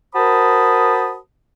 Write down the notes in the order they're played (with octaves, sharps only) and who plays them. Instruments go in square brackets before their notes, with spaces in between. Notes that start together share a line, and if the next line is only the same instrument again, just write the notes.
[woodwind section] F#4 A#4 C5 A5 B5 D#6